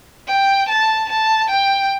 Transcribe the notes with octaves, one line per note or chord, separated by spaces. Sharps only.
G5
A5
A5
G5